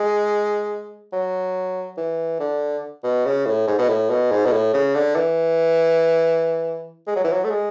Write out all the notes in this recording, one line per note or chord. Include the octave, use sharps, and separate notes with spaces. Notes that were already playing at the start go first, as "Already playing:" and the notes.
Already playing: G#3
F#3
E3
D3
B2
C#3
A2
G#2
B2
A2
B2
G#2
B2
A2
C#3
D3
E3
G#3
F#3
E3
F#3
A3
G#3